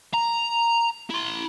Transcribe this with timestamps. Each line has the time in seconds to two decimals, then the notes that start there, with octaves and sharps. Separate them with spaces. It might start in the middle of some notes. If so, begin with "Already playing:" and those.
0.14 A#5
1.10 E4 C6